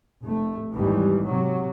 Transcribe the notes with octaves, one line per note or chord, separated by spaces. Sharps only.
F1 A3
G#1 D#2 E3 G3
C3 F#3